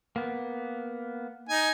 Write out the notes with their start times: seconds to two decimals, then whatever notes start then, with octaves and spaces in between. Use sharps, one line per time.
0.16 A#3 B3
1.49 D#4 G#5